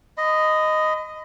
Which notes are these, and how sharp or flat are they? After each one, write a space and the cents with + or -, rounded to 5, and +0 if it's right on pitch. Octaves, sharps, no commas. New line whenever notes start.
D#5 +0 B5 +35